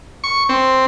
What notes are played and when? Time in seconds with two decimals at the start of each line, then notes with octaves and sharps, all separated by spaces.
0.24 C#6
0.49 C4